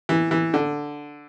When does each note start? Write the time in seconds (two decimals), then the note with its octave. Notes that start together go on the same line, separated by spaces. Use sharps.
0.09 E3
0.31 E3
0.54 D3